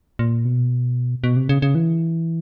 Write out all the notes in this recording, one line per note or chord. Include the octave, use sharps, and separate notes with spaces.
A#2
B2
B2
C3
C#3
C#3
E3